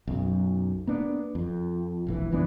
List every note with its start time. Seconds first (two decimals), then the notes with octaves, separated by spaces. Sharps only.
0.07 B1 F#2
0.87 A#3 B3 D4
1.35 F2
2.07 E1 A#1 E3
2.32 F#1 E3 B3 D4